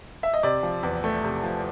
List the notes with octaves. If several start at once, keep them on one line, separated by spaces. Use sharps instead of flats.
E5
D#5
C3 D5
F3
E2
A3
C3
F3